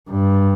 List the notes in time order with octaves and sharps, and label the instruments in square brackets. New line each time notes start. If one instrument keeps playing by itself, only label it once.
[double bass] G2